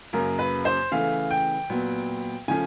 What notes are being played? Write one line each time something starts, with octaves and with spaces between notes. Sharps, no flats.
F#2 C#3 F#3 A#3 A#4
B4
C5
C#3 E3 A3 F5
G5
A#2 F#3 B3
C#3 F3 A3 C#4 G#5